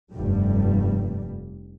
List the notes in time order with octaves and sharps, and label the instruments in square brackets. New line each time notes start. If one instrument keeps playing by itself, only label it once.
[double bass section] F1 G2 G3